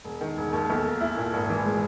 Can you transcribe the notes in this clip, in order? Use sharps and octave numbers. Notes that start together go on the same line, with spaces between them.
E1
D#3
E1
D#2
B1
A#3
E4
A#2
G#1
E3
G#3